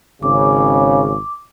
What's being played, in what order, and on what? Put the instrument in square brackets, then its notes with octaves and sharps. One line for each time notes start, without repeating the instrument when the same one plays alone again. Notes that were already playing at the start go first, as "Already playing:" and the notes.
[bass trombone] G#1 [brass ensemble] C#3 [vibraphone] D6